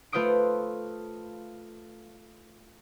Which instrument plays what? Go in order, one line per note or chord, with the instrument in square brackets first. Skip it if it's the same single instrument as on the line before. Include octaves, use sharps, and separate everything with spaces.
[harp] A3 F4 B4 C5 D#6 D7